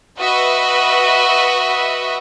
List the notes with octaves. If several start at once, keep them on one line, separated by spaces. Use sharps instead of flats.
F#4 B4 D#5 E5